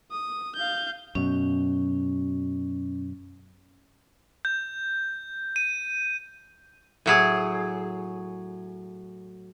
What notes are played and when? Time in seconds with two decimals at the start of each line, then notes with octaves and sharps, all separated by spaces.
0.11 D#6
0.56 F5 G6
1.15 F#2 B2 C#4
4.45 G6
5.56 D#7
7.06 A2 F#3 G#4